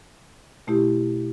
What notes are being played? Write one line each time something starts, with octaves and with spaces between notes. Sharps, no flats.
B2 A3 E4 G4